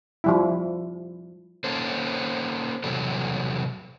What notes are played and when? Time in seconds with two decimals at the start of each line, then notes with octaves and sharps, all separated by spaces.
0.24 F3 G3 E4
1.64 A#3 C#4 A4 C5
2.84 E2 C3 F#3 G3 A4